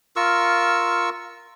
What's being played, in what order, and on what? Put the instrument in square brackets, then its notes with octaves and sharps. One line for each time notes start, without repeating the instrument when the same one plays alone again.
[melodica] F4 A#4 C#6 E6